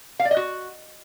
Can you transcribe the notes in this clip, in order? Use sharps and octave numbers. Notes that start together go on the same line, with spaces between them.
F5
D5
D#5
F#4